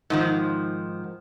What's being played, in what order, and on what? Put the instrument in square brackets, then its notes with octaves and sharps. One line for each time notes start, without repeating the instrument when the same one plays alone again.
[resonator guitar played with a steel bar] G#2 D#3 F3